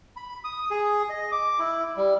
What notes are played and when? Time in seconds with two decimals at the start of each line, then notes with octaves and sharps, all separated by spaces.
0.16 B5
0.44 D#6
0.71 G#4
1.10 D#5
1.32 D6
1.59 E4
1.96 G3